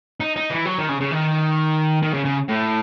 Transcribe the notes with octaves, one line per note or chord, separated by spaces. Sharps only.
D#4
D#4
E3
F#3
D#3
C#3
C#3
D#3
D#3
C#3
C#3
A2